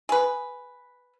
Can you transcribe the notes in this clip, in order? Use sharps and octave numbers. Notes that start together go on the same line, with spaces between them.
G#4 B4